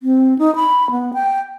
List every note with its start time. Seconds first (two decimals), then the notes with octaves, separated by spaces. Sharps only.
0.03 C4
0.39 D#4
0.56 B5
0.91 B3
1.14 G5